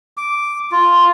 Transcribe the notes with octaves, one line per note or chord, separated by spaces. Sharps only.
D6
F4